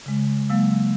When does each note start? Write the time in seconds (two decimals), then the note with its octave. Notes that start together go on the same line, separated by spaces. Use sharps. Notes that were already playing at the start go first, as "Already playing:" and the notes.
0.06 C#3 G#3
0.50 F#3 G#3 A#3 F5 E6